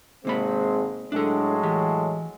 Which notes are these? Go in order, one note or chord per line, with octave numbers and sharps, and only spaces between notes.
G#1 C3 G#3 A#3 C4 B5
A2 F#3 G#3 D4 A4
E3 G4